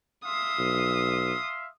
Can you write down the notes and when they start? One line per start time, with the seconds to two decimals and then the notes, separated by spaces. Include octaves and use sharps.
0.25 E5 F5 C6 D#6
0.59 B1